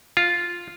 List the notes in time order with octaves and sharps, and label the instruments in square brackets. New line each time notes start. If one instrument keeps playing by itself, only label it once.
[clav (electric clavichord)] F4